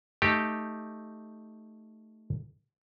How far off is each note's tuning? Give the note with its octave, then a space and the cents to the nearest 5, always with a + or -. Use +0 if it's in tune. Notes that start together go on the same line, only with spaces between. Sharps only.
A3 +0 D#4 +0 G4 +0